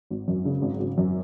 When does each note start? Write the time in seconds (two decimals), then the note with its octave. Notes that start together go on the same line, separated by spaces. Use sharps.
0.10 G#1
0.28 F#2
0.45 C#3
0.62 G#1
0.79 G#1
0.98 F#2